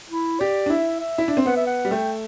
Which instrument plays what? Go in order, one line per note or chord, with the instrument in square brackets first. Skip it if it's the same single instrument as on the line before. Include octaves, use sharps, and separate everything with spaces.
[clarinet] E4
[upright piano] G4 [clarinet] D5
[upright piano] D4
[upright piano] E4 [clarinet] E5
[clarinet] E5
[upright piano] E4
D4
C4
[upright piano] B3 [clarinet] F#5
[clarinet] E5
F#5
[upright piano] G3
[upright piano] A3 [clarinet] G5